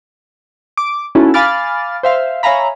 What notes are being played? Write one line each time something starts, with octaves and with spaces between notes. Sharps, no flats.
D6
C#4 D#4 E4 F#4 A4
F5 G#5 B5 D6 F6 A6
C5 E5 F5
C#5 E5 F5 G#5 A#5 B5